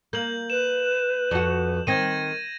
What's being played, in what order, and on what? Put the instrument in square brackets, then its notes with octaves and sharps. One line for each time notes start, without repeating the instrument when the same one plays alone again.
[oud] A#3 [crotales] G6 F#7
[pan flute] B4 [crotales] E7
[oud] F2 F#4
[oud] D#3 C4 [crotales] G#6 A#6 D#7